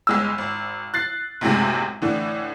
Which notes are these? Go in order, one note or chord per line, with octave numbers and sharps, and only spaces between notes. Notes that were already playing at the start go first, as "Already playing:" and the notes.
G1 G#3 E6
G#1
F#6 A6 C7
B1 F#2 A2 C3 G#3
A2 D3 E3